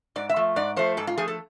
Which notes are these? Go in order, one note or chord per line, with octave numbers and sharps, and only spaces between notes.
G#2 D5
E5
F3 A3
G#2 D5
F3 A3 C5
G#2 A4
F4
F3 A3 G#4
A4